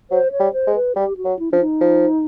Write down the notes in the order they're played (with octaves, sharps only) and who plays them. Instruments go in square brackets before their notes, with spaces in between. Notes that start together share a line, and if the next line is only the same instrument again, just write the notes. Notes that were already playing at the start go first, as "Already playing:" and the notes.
[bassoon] F#3 [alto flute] C5
[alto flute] C#5
[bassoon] G3
[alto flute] C5
[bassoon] G#3
[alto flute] B4
[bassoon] G3 [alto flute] G4
[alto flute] F#4
[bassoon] F#3
[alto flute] E4
[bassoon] F3 [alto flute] D4
[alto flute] D#4
[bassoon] F3